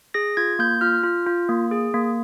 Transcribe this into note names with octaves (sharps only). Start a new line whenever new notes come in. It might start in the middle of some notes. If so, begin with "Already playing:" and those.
G#4 A#6
F4 G#6
A#3 G6
F4 F6
F4
F4
A#3
G#4
A#3